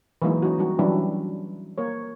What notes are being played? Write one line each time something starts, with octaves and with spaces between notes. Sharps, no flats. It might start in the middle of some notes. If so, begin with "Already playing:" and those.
E3 F#3 G#3 A#3 D#4 E4
C#4 D#4 F#4
G3 D#4 F#4
E3 F#3 G3 C#4 D4 E4
A#3 A#4 C#5